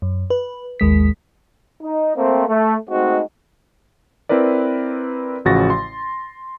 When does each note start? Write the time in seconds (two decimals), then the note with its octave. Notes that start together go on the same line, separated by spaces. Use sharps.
0.02 F#2
0.30 B4
0.80 A1 D#2 G#3 B6
1.83 D#4
2.16 A3 A#3 C4
2.47 A3
2.90 G#3 A3 C4 D#4 F#4
4.29 C4 E4 A#4 B4 D5
5.45 A1 C#3 F3 F#4 A6 A#6
5.70 C6